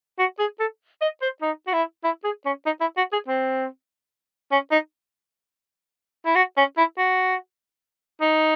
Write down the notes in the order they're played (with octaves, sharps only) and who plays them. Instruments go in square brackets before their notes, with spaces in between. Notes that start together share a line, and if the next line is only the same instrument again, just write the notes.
[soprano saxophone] F#4
G#4
A4
D#5
C5
D#4
F#4
E4
E4
G#4
C#4
D#4
E4
F#4
G#4
C4
C#4
D#4
E4
F#4
C#4
E4
F#4
D#4